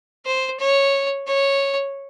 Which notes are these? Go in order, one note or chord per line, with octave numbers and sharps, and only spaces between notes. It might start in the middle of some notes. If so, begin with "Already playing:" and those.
C5
C#5
C#5